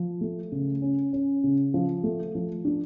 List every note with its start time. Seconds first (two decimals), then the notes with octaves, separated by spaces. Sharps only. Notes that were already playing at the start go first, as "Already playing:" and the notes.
Already playing: F3
0.21 A3
0.52 C#3
0.82 C#4
1.13 C#4
1.44 C#3
1.74 F3
2.03 A3
2.35 F3
2.65 D4